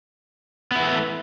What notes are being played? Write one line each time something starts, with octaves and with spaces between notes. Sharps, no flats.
E3 A3 B3 E4